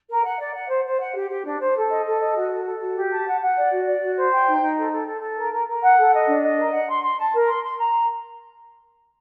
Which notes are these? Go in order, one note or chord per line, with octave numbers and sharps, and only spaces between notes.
A#4
F#5
D5
F#5
C5
C5
F#5
G4
G4
D4
C5
A4
D#5
A4
D#5
F#4
A4
A4
F#4
G4
A5
F#5
F#5
D5
F#4
D5
F#4
C5
G5
D#4
D#4
A4
A4
A4
A4
A#4
A#4
A#4
F#5
A4
D#5
D4
D#5
A#4
F#5
C6
C6
A5
A#4
C6
C6
A#5